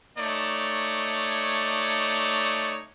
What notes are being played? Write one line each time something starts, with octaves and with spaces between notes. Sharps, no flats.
A3 D#4 C#5 D5